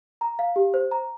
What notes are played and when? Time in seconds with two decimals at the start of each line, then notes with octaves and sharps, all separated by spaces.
0.21 A#5
0.39 F5
0.56 G4
0.74 C5
0.91 A#5